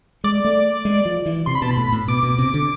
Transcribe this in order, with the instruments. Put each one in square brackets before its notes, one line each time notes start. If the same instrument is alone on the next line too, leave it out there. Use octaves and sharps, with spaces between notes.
[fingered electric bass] G#3 [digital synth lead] D5
[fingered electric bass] A3
G#3
F3
E3
[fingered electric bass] C3 [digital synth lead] C6
[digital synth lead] B5
[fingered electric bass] B2 [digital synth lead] A5
[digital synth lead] B5
[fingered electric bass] A2
A2
[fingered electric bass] B2 [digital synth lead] D6
[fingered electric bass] B2
C3
D3